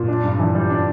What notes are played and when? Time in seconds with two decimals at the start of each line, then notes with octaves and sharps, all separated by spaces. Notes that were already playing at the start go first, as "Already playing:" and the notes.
Already playing: A#2
0.08 D4
0.24 G2
0.39 E3
0.55 G3
0.70 D4